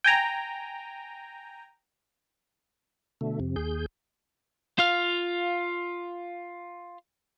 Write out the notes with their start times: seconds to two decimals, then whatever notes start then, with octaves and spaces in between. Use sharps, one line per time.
0.04 G5 G#5 A#5
3.21 B2 D3 A3
3.40 F2 C3
3.56 D#2 G#4 G6
4.79 F4 F5